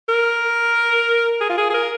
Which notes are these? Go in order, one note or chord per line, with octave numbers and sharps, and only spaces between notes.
A#4
G#4
F4
G#4
G#4
A#4